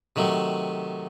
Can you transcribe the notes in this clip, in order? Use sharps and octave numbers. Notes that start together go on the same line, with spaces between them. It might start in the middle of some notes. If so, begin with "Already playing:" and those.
C3 D#3 F#3 A3